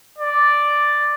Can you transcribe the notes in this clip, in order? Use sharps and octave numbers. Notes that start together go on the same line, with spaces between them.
D5